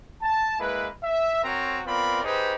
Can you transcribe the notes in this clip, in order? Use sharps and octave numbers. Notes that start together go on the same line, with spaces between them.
A5
G#3 A#3 E4 B4
E5
C4 F#4 A#4 C5 C#5 A#5
B3 C4 F4 A#4 D5 B5
D#4 G4 G#4 B4 C5